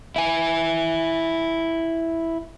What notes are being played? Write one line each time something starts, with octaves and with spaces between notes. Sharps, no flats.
E4 G#5